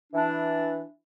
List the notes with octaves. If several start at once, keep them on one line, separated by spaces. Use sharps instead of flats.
E3 D4